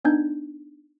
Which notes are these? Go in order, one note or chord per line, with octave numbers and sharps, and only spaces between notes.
B3 D4 D#4 G#5 G6 G#6